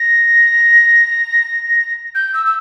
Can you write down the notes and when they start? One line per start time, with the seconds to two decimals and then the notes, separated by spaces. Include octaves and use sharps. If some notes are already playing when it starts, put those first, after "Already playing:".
Already playing: A#6
2.14 G6
2.33 E6
2.45 E6